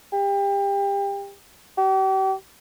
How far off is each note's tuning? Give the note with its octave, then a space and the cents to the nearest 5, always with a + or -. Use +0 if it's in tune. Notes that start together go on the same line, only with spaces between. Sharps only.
G4 +30
G4 -40